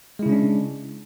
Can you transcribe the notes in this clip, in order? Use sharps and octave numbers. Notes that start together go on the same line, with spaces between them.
C#3 G#3 C#4 D4 E4